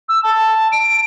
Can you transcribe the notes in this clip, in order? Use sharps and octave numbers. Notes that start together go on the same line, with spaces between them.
E6
A5
D7